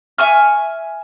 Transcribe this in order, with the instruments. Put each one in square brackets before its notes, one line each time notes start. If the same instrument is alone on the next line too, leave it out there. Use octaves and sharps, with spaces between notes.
[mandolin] E5 G#5 C#6 F6